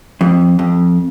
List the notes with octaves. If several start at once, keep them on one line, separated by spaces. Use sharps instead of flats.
F2
F2